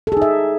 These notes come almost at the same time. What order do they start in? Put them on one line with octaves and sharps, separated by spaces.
A4 G#4 D#4 E5